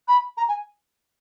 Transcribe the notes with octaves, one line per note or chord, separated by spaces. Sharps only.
B5
A#5
G#5